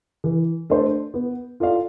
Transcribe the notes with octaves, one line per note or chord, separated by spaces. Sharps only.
E3
A3 D4 A4 C5
B3
F4 A4 D5 F5